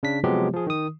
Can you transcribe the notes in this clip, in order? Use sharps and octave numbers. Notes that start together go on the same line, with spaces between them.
C#3 D4 B6
C3 F3 F#3 G#3 B3 G4
F3 G#4
D#3 D#6